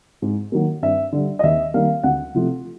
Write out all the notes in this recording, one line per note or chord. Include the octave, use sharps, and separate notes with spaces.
G#2
D#3 F#3 A#3
G2 E5
D3 G3
D#5
D#2 E5
D#3 G3 A#3 F5
D2 F#5
C3 F3 A3